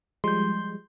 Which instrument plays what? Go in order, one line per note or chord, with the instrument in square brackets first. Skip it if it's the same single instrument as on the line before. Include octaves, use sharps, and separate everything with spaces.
[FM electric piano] F3 G3 G#3 [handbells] C6 G6